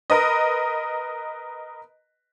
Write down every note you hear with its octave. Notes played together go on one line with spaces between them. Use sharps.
A#4 B4 D#5